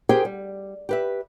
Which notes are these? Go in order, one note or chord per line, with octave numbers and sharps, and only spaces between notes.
G4 G#4 A#4 C5 G5 G#5
G3
G4 B4 E5